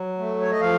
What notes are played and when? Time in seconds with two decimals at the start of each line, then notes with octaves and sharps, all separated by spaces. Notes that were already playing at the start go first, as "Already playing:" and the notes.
Already playing: F#3
0.18 A3
0.41 C#5
0.52 D#5
0.60 F3 F5